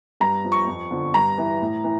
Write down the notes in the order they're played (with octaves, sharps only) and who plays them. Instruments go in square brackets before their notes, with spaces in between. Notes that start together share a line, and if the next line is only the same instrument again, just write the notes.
[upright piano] G2 A#5
F3
C#6
F2
D3 F3
G2 A#5
E3
A2
E3